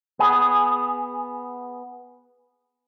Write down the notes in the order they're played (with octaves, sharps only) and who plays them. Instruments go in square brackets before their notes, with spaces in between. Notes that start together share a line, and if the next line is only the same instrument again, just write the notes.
[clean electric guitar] B3 G#4